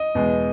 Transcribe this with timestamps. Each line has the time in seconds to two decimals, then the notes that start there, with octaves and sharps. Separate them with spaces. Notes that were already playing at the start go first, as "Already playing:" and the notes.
Already playing: D#5
0.15 E2 B2 G#3